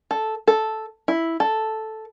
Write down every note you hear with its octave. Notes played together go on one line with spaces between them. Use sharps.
A4
A4
E4
A4